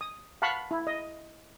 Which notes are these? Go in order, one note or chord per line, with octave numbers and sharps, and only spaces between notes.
D#6
F5 F#5 A5 B5 C#6
E4
D#5